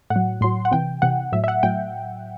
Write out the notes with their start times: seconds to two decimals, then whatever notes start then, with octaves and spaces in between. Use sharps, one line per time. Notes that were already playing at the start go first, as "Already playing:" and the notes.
0.10 A2 F#5
0.16 F#3
0.41 A2 F#3 C6
0.65 F#5
0.71 C3 E3 G5
1.02 C3 E3 F#5
1.32 A2 F#3 E5
1.44 E5
1.48 F#5
1.63 A2 F#3 G5